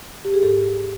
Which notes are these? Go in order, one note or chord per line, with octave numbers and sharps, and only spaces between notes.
G4
G#4
G#2 G4 A4